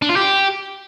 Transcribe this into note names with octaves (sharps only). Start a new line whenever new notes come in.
D4
F4
G4